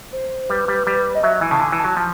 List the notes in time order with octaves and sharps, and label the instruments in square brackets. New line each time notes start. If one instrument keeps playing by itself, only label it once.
[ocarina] C5
[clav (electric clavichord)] G3 [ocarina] B4
[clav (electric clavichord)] G3
G3
[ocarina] D#5
[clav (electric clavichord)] F#3 [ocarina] E5
[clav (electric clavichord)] E3 [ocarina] G#5
[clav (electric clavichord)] C#3 [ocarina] A5
[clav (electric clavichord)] D3 [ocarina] G#5
[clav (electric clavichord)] E3
[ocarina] A5
[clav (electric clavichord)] F#3
F3